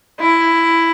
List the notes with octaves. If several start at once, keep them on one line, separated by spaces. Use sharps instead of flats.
E4